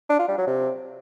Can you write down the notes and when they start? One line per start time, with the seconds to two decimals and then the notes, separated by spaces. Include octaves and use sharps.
0.10 D4
0.19 F4
0.28 G3
0.38 F#3
0.47 C3